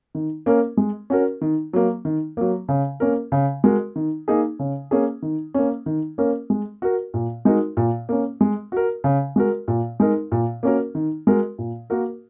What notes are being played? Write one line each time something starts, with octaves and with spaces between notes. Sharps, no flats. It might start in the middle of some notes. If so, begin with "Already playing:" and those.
D#3
A#3 C#4 A#4
G#3
C#4 F#4 A#4
D#3
F#3 A#3
D#3
F#3 A#3
C#3
A#3 C#4 A#4
C#3
G#3 F#4 A#4
D#3
A#3 D#4 G#4
C#3
A#3 C#4 G#4
D#3
A#3 C#4
D#3
A#3 C#4 A#4
G#3
F#4 A#4
A#2
G#3 D#4 F#4 A#4
A#2
A#3 C#4
G#3
F#4 A#4
C#3
G#3 F#4 A#4
A#2
G#3 D#4 A#4
A#2
A#3 C#4 F#4 A#4
D#3
G#3 F#4 A#4
A#2
A#3 F#4 A#4